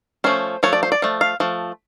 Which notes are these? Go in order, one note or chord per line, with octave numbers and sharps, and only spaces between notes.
F3 A3 C#4 C5
F3 A3 C#5
D5
C5
D5
F3 A3
F5
F3 A3